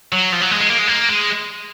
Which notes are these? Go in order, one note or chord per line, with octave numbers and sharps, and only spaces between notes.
F#3
F3
F#3
G#3
G#3
A#3
G#3
A#3
G#3